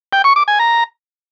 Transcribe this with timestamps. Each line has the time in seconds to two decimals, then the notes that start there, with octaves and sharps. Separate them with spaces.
0.13 G5
0.24 C#6
0.36 D6
0.48 G#5
0.59 A#5